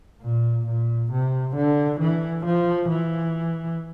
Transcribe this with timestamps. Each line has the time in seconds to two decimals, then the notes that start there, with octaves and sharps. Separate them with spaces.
0.22 A#2
0.66 A#2
1.12 C3
1.56 D3
2.00 E3
2.45 F3
2.89 E3